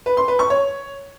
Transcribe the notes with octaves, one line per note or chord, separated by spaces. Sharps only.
B4
C6
B4
C#6
C#5